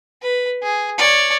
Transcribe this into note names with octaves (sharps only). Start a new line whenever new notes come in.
B4
G#4
C#5 D5